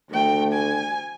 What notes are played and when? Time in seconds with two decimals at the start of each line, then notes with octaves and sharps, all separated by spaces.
0.11 D2 A3 G5
0.53 G#5